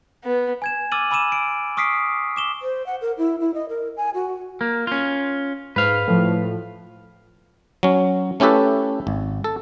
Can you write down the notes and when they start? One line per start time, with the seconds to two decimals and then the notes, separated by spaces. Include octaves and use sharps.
0.24 B3
0.62 G#5 G#6 E7
0.92 D6 E6 F6 A6 D#7 F#7
1.11 G#5 B5 D6 E6 D#7 E7
1.32 D7
1.77 C#6 D#6 F6 B6 C7 D7
2.36 D6 E7 G7
2.62 C5
2.86 F#5
3.01 A#4
3.18 E4
3.40 E4
3.54 D#5
3.69 A#4
3.97 G#5
4.14 F#4
4.61 A#3
4.87 C#4 F4
5.76 G#2 B4 F5
6.07 A2 F3
7.83 F#3 C#4
8.40 A3 C#4 E4 G4 A4 B4
9.07 G#1
9.44 A4